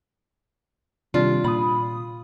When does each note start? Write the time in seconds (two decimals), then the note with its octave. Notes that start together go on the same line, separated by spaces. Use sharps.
1.14 C3 D#3 G3 D4 F4
1.44 A#2 B5 D#6